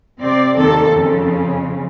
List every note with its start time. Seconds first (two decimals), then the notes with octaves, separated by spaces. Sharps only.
0.22 C3 C4 D5
0.59 D#2 D#3 A4
0.95 F2 C#3